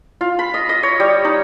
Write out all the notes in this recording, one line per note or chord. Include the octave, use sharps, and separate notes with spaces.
F4
B5
D#5
D#5
C#5
G3
D#4